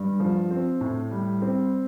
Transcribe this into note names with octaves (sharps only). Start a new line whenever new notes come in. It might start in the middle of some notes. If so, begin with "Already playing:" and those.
Already playing: G2
F3
C4
A2
G3
C4